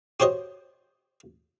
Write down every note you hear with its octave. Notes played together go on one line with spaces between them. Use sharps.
F#4 G4 C5 C#5 D#5